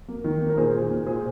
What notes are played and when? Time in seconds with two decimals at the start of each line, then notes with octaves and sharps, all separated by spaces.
0.08 A#3
0.24 D#3
0.41 A#3
0.49 A#4
0.57 A#2 G#4 C5
0.74 A#2
0.90 A#2
1.06 A#2 G#4 C5